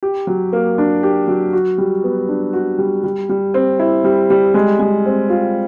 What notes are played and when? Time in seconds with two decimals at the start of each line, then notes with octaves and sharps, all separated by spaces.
0.03 G4
0.27 F#3
0.53 A#3
0.78 D4
1.03 G4
1.28 F#3
1.53 F#4
1.78 G3
2.04 B3
2.28 D4
2.53 F#4
2.78 G3
3.04 G3
3.29 G3
3.54 C4
3.79 E4
4.04 G3
4.30 G3
4.54 G#3
4.79 G#3
5.06 C4
5.30 F4